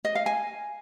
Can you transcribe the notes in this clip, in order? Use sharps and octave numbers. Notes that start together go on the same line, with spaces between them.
D#5
F5
G#5